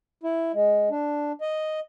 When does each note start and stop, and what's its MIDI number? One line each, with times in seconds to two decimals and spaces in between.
0.23 0.52 64
0.53 0.89 56
0.90 1.32 62
1.41 1.80 75